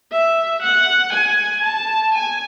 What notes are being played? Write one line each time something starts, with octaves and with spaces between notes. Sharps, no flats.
E5
F#5
G#5
A5
G#5